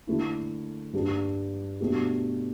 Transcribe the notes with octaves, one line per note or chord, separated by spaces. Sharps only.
D3 A3 E4
G2 G3 D4
B2 A3 D4 G4